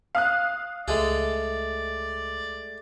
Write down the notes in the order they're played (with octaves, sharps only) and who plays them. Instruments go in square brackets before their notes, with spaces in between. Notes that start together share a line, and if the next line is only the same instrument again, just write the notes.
[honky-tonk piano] F5 D#6 F#6
[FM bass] C#2 [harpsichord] G#3 A3 G#4 [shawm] D5